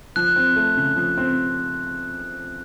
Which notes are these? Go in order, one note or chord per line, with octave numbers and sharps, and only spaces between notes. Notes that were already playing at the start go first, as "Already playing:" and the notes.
F3 F#6
C4
A3
C#3
F3
C4